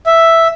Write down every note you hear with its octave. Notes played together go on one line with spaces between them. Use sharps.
E5